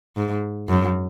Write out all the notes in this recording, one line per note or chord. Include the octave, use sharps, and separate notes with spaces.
G#2
F#2